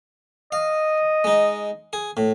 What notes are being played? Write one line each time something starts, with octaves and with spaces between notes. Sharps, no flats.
D#5 F5
G#3 D#4
G#4
A2